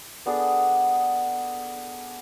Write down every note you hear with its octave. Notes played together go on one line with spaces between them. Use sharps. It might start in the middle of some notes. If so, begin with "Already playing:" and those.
B3 D4 G#4 A4